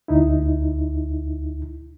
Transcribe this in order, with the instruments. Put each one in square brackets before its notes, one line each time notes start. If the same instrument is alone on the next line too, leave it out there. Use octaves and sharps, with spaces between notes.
[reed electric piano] D2 D#4 E4